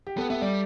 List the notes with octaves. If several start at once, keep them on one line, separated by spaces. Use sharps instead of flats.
G4
B3 A4
B3 E5
G3 D5